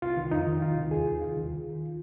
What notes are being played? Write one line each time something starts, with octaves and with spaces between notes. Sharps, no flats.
C2 F4
D#3
F2 D#4
D#3
C2 F4
C2
D#2 G#4
D#2
C2 F4
D#3